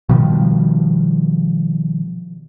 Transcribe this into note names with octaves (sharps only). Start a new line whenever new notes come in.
B2 D#3 F3 G3